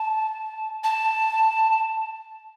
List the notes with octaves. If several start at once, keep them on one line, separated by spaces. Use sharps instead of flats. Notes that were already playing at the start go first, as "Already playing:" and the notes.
Already playing: A5
A5